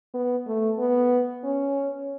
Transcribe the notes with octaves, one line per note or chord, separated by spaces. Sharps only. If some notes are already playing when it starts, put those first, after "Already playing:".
B3
A3
B3
C#4